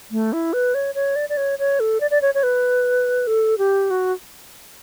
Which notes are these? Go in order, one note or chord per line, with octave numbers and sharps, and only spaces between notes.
A3
E4
B4
C#5
C#5
D5
D5
C#5
C#5
A4
D5
D5
C#5
C#5
B4
A4
G4
F#4